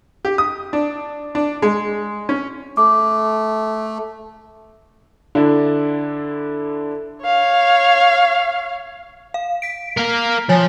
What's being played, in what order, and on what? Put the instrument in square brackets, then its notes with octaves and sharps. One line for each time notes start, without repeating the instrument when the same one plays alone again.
[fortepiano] G4
D#6
D4
D4
G#3
C#4
[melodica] A3 [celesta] D6
[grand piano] D3 D4 E4
[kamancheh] C#5 F5
[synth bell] F5
B6 D7
[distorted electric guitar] A#4 F5
[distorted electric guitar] F3 [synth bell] C#5 G#5